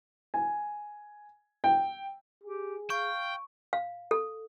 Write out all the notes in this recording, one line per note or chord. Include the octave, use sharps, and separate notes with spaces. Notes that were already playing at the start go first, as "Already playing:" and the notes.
G#5
G5
G4 G#4
F5 G5 C#6
F5
A4